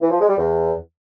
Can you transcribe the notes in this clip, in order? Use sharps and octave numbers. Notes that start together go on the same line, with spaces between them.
E3
F3
G#3
G3
E2